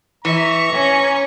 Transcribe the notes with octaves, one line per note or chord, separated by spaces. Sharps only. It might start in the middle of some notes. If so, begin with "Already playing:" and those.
E3 E5 A#5 C#6
C#4